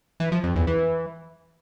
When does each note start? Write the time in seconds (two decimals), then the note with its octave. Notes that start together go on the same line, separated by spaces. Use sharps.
0.20 E3
0.32 F3
0.44 F2
0.55 E2
0.67 E3